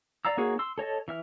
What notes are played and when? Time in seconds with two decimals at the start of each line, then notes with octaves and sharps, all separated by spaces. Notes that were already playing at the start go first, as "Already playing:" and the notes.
0.25 D5 F5 A#5 E6
0.37 A#3 D#4 F#4 G#4 C#5
0.59 C6 E6
0.78 A4 C#5 D#5 A5
1.08 E3 E5 F6